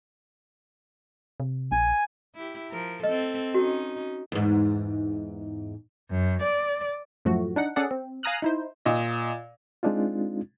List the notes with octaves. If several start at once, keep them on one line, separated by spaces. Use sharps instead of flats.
C3
A#1 G#5
E4 G4
F3 A#4
C4 A4 D#5
C#4 D#4 F#4
E2 G#2
F#2
D5
F#2 A2 F3 A3 F#4
D4 D#4 F#5
C#4 G#4 A4 D5 F#5
C4
F5 G#5 A#5 D#6 F6 F#6
D#4 E4 C5
A#2 D#5
G#3 C4 D4 D#4 F4